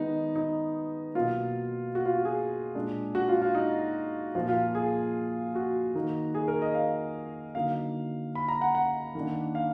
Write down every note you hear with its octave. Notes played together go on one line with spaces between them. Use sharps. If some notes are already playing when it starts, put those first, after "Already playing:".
Already playing: D#3 G#3 B3 D#4
D#4
B2 F#3 A#3 F4
F#4
F4
F#4
G#4
A#2 G#3 D4
F#4
F4
F4
D#4
A#2 F3 A#3 F4
F4
G#4
F#4
D#3 A#3 D#4
G#4
A#4
D#5
F5
D3 F#3 A#3 D#4 F5
B5
A#5
F#5
F#5
D#3 A#3 D4
F5